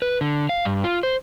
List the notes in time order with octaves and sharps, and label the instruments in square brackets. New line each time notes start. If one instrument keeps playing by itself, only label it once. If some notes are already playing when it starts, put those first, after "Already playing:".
[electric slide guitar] B4
D3
F5
G2
F4
C5